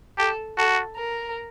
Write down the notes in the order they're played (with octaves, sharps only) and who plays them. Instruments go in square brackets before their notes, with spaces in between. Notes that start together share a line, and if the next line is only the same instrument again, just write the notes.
[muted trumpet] G4 [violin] A4
[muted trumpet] F#4 [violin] A4
[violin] A#4